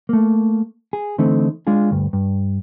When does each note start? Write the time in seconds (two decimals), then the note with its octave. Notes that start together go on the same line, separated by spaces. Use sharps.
0.09 A3 A#3
0.93 G#4
1.18 D3 E3 A3 C4 D#4
1.67 G#3 D4 F4 G#4
1.91 D2 G2
2.13 G2